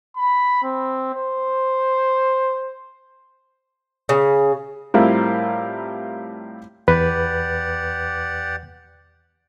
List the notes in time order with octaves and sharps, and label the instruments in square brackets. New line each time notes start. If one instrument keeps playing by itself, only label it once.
[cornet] B5
C4
C5
[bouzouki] C#3
[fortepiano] A2 G3 C4 E4 F4 A#4
[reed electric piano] E2 B4 [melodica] G4 D5 F#5